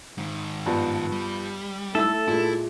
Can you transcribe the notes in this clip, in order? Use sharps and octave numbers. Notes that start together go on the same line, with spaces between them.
G#2 D#3
G2 F3 B3
G3
A3 E4 A4 E6
A#2 G#3 E4